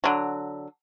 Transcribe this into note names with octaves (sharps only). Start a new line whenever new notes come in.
D3 F#3